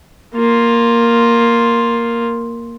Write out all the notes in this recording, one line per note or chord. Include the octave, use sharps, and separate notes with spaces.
A#3 F4